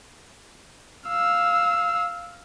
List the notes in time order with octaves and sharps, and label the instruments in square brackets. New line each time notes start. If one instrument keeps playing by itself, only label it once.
[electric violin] F5 E6